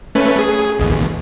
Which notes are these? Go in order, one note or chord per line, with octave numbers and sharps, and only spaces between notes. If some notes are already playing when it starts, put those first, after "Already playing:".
A3 C#4 B4
G#4
A1 D#2